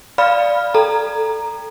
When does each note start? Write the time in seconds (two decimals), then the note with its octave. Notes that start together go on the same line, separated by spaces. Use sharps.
0.18 D5 F5 B5 F6
0.74 A4 A#5